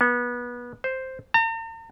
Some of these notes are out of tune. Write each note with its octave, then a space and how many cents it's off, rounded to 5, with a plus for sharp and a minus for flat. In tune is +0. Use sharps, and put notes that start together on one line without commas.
B3 -25
C5 +0
A#5 -45